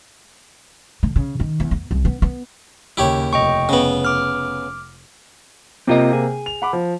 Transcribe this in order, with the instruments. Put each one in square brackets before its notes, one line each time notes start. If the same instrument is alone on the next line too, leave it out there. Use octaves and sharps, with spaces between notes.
[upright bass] D3
C#3
D#3
E2
B3
C2
B3
B3
[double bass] D#2 C#3 [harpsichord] E4 G4 C#5
[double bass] F1 [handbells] D#5 G5 C#6
[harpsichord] C#3 B3
[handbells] D6 F6
[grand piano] C3 A#3 [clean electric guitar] C4 F4 D#5
[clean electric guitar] G#4
[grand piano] F7
F#5 B5 D6
F3